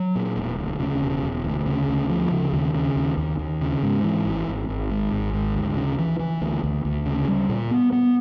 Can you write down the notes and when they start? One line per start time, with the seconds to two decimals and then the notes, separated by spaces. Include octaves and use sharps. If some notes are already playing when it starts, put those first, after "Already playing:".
Already playing: F#3
0.15 A#2
0.37 E1
0.59 D2
0.80 C#3
1.02 E1
1.23 E1
1.44 D2
1.67 C#3
1.88 D2
2.10 F3
2.31 C#3
2.53 D#2
2.74 C#3
2.96 D#2
3.17 D#2
3.39 D#2
3.61 C#3
3.83 G#2
4.04 E3
4.25 G#1
4.48 G#1
4.68 G#1
4.90 G#2
5.12 G#1
5.34 G#2
5.55 D2
5.77 C#3
5.99 E3
6.19 E3
6.42 D2
6.64 D2
6.85 D2
7.06 C#3
7.28 G3
7.49 A#2
7.71 B3
7.92 B3